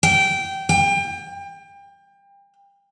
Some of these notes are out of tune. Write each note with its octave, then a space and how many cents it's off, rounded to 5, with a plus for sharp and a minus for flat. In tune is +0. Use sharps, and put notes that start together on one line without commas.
G5 -15
G5 +30